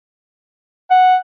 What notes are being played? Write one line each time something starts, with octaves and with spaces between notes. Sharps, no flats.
F#5